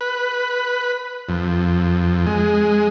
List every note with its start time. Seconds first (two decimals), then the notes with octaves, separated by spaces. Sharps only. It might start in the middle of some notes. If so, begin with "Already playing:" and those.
0.01 B4
1.29 F2
2.27 G#3